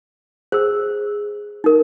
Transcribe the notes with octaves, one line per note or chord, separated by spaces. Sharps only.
G#4 C5 E6
D#4 A#4